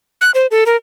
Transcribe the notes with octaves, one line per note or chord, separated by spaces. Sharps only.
F#6
C5
A4
A#4